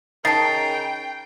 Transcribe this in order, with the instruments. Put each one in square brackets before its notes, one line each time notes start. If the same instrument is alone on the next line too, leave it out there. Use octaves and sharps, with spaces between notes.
[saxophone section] C#3 A#4 [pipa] D#4 A5 [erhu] G5 [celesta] A6 C7